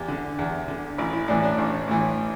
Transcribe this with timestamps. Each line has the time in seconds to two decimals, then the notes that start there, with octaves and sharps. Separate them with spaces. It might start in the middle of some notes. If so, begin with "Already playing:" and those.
Already playing: E2 G4
0.08 D3
0.39 E2
0.68 D3
0.98 A1 E4
1.13 E4
1.28 A2 E3 D4
1.43 D4
1.58 A1
1.88 A2 E3